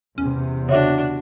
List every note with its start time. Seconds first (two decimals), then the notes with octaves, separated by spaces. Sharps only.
0.18 E2 C3 C#4
0.69 C#3 D4 F#4 C#5 E5 D6